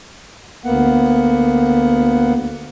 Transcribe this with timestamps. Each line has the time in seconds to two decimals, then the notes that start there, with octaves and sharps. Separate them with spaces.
0.65 D2 A#3 B3 F#5